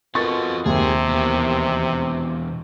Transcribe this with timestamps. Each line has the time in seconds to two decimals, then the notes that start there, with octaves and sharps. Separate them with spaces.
0.15 B2 C4 F4 A4 A#4 C#6 A6
0.66 D#2 C3 G#4
1.08 E2 B2